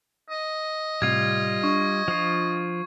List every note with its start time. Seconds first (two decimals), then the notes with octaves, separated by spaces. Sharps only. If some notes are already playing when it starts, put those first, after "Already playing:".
0.30 D#5
1.02 A2 C3 G3 F4 G#6
1.63 D4 C#6
2.08 F3 F4